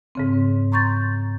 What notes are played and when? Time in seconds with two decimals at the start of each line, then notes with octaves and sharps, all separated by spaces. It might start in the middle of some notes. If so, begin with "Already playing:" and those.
0.15 G#2 C#3 C4
0.72 A#5 C6 C#6 G6 A6